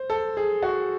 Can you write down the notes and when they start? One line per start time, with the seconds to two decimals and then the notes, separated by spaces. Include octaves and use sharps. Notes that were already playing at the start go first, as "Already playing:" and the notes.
Already playing: C5
0.10 A4
0.37 G#4
0.63 F#4